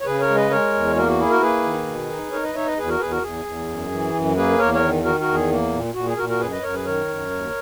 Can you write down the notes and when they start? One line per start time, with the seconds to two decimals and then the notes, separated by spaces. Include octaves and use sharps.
0.01 C#5
0.05 C#3 G#4 B4
0.20 A#4 C#5
0.29 G#3
0.36 B4 D#5
0.50 G#3 A#4 C#5
0.73 E2
0.96 A#3 F#4 A#4
1.08 F#4
1.19 E4 G#4
1.30 F#4 A#4
1.41 A#3 G#4 B4
1.64 D#3
1.86 B2
2.10 D#4
2.32 D#4 A#4 C#5
2.43 B4 D#5
2.54 D#4 C#5 E5
2.66 B4 D#5
2.77 E2 G#4 B4
2.88 F#4 A#4
3.00 E2 G#4 B4
3.11 F#4 A#4
3.22 E2 G#4
3.45 E2
3.68 F#2
3.91 E3
4.14 F#2
4.36 A#3 G#4 B4
4.58 E2 A#4 C#5
4.73 A#4 C#5
4.82 D#3
5.04 D#3 F#4 A#4
5.20 F#4 A#4
5.27 E2
5.34 G#4
5.50 A#3
5.73 A#2
5.95 A#2 F#4
6.07 G#4
6.17 A#2 F#4 A#4
6.29 F#4 A#4
6.40 F#2 G#4 B4
6.51 B4 D#5
6.62 F#2 A#4 C#5
6.74 G#4 B4
6.85 D#3 A#4 C#5
7.08 F#2
7.31 D#2